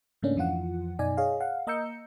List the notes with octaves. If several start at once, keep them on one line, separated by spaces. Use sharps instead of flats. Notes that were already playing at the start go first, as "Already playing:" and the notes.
G#2 C#3 A3 A#3 C#4 D4
F2 E3 F3 F4 F#5
F#2 B2 D#4 D5 G#5
G#4 C#5 D#5 F5
F5 F#5
A#3 D#5 A#5 E6 G6 C#7